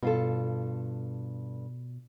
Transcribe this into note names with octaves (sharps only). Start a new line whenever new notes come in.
G2 B2 F4 A4